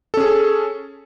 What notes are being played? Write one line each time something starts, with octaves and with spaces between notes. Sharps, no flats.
C#4 G#4 A4